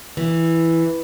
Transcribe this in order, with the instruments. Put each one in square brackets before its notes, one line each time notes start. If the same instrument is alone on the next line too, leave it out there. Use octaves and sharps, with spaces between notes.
[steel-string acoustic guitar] E3